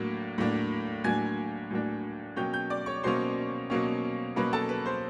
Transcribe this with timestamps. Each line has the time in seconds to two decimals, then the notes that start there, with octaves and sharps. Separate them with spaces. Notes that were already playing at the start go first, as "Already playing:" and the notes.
Already playing: A2 F#3 A#3 D4
0.38 A2 F#3 A#3 D4
1.04 A2 F#3 A#3 D4 G#5 G#6
1.70 A2 F#3 A#3 D4
2.36 B2 F#3 A#3 C#4 G5 G6
2.53 G5 G6
2.70 D5 D6
2.86 C#5 C#6
3.03 B2 F#3 A#3 C#4 C5 C6
3.70 B2 F#3 A#3 C#4
4.36 B2 F#3 A#3 C#4 B4 B5
4.53 A4 A5
4.69 B4 B5
4.86 C5 C6